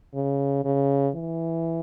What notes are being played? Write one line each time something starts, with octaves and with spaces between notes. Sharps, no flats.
C#3
C#3
E3